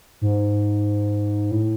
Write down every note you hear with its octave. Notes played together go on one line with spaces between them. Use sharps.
G#2
A2